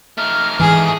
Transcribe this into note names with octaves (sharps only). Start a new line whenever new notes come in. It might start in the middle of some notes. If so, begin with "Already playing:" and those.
A3 D#4 F6
G#2 E3 G#4